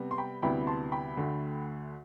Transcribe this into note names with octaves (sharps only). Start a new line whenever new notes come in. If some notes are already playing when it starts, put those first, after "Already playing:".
Already playing: C3 G3 B3
C6
G5 B5
D2 C3 G3 B3 E4 G5 B5
A5 C6
G5 B5
D2 D3 A3